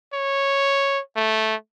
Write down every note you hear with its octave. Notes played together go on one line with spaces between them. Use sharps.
C#5
A3